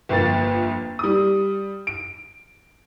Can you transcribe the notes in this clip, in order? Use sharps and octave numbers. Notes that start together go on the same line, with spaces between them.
G1 F2 A#3 A6
G3 D#6
D7